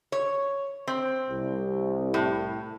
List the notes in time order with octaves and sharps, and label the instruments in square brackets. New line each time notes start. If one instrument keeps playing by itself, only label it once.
[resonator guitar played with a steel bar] C#5
C4
[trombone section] C2
[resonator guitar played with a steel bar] A2